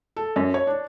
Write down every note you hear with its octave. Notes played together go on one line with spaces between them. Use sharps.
A4
F#2
C#5
D4